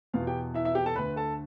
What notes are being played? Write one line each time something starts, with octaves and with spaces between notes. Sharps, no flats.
E2 B2 F4 F5
G4 G5
E4 E5
E4 E5
G4 G5
A4 A5
D2 D3 B4 B5
A4 A5